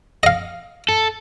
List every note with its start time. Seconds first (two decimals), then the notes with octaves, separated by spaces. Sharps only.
0.23 D#5 F5
0.89 A4